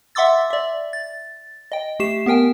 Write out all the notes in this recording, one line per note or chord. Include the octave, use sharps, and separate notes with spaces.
E5 F#5 C6 D6 E6 A6
D5 E5
A6
D#5 G5
A3 G4 C7 E7
B3 G4 A#4 G5 G#5